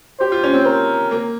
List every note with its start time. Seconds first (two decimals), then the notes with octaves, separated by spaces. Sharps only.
0.20 G4 C5
0.32 F4
0.43 C#4
0.54 C4
0.66 A#4
1.11 A#3